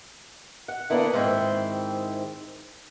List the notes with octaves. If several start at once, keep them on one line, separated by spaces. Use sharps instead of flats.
F#5
D3 A#3 B3 E4
G#2 D#3 C4 E4 G5